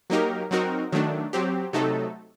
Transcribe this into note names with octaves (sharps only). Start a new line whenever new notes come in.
F#3 A#3 D#4 G4 A#4
F#3 C4 D#4 F#4 A#4
D#3 F#3 A3 D4
F#3 C4 G4
C3 F#3 A3 D#4 A4